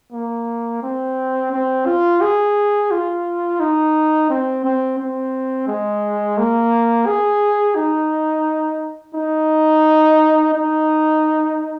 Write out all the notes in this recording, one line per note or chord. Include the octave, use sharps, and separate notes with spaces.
A#3
C4
C4
F4
G#4
F4
D#4
C4
C4
C4
G#3
A#3
G#4
D#4
D#4
D#4